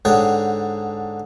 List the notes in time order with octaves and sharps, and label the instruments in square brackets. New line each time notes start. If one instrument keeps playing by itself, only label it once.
[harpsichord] G#2 D3 G#4 C#5 F#5 G5